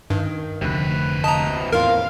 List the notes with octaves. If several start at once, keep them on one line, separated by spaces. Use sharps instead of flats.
G2 D#3
F1 D2 C3 B4
F2 D#5 A5 A#5
E2 A2 C4 F4 A#4 F5